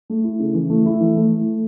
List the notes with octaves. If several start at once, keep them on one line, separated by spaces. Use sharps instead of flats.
A3
E4
C#3
E3
A3
E4
E3
A3